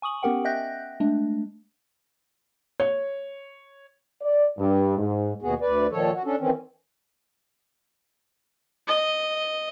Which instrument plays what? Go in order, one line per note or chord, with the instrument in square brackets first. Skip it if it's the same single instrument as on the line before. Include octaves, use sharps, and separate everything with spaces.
[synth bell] G#5 C#6 D#6 F#7
B3 C#4 G4 A#4 F#5 G5
D#5 E5 G5 F#6 G6 A#6
G#3 A3 D4
[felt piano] C#5
[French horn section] D5
G2
G#2
[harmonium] D#2 B2 B3 F#4 G#4
D2 B4 D5
A#2 D#3 F3 A4 C#5
F#4
C#4 D4 A4
D#3 E3 C4 C#4
[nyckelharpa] D#5